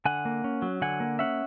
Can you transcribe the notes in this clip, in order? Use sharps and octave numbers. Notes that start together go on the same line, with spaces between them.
D3 F#5 G#5
A#3
C#4
F#3
D3 F#5 G#5
A#3
C#4 E5 F#5